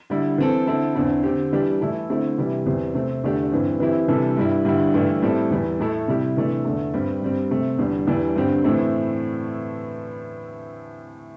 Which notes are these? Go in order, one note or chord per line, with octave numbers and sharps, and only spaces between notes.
D3 G3 E4
E3 C4 A4
D3 C4 E4 A4
E2 D3 C4 E4
D3 C4 G4
E3 G3 D4 G4
E3 A3 E4 A4
D3 A3 C4 E4
C3 E3 G3 E4 G4
E2 E3 C4 G4
C3 A3 C4
E2 D3 A3 D4 G4
G2 E3 C4
E3 C4 E4 G4
C3 E3 G3 D4 A4
G2 G3 E4
G2 D3 G3 E4
G2 E3 A3 E4
A2 G3 C4 E4 A4
E2 E3 G3 E4
A2 A3 E4 A4
C3 G3 E4 G4
C3 E3 A3 D4
E2 D3 A3
G2 G3 C4
G2 G3 C4
C3 A3 C4
E2 D3 G3
E2 E3 G3 D4 G4
G2 D3 C4 G4
A2 E3 A3 C4 E4